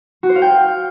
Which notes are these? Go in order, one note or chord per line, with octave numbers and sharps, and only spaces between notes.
F#4
C5
F5
G5